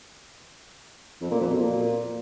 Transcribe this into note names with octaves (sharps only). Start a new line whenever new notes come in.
F2
A#2
F2
B2
A#2